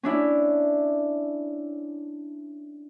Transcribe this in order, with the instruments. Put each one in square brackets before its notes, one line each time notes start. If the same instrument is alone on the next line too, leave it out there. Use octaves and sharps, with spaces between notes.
[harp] C#4 D4 E4